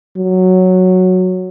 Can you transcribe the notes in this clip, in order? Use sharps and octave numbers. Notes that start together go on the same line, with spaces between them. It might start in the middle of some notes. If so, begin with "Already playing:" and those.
F#3